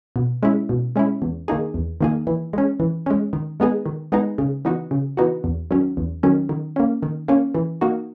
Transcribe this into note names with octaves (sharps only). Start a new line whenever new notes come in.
B2
G#3 C#4 E4
B2
G#3 C#4 E4
E2
D#3 A#3 D#4 G#4
E2
D#3 A#3 D#4 G#4
E3
G#3 C#4
E3
G#3 C#4
D#3
G#3 B3 D#4 G#4
D#3
G#3 B3 D#4 G#4
C#3
E3 B3 D#4 F#4
C#3
E3 B3 D#4 F#4
E2
D#3 F#3 C#4
E2
D#3 F#3 C#4
D#3
A#3 C#4
D#3
A#3 C#4
E3
A#3 D#4 F#4